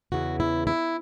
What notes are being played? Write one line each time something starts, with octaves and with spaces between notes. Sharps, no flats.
E2 C#3 E3 F#4
E4
E4